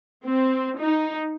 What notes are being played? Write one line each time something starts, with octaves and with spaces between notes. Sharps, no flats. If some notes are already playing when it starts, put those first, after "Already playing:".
C4
D#4